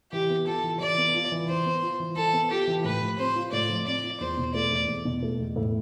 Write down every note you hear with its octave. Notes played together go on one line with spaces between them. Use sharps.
E3 G4
B3
F4 A4
E3
E3 D5
B3
F4
E3
E3 C5
B3
F4
E3
E3 A4
B3
F4 G4
E3
A2 B4
F3
C4 C5
F4
A2 D5
F3
C4 D5
F4
E2 C5
B2
A3 D5
E2
E2
B2
A3
E2
A2